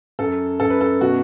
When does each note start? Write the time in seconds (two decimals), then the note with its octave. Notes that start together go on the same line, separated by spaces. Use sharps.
0.19 F#2 A4
0.60 F#2 A4
0.70 B4
0.81 A4
1.01 B2 F#4